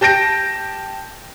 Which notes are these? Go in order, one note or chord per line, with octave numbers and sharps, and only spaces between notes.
G4 A5 G6 A#6 D7